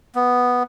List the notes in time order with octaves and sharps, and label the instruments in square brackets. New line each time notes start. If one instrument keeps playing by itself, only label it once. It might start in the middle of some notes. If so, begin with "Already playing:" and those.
[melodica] B3